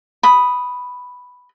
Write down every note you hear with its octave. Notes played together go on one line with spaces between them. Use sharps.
B5 D#6